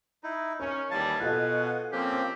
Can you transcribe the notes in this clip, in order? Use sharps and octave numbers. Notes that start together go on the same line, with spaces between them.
D#4 E4
C#4 D#4 A#4 C#5
D#2 E3 G3 F5 G#5 A5
B2 F4 A4 D#5 F#5
F3 A#3 C4 C#4 G4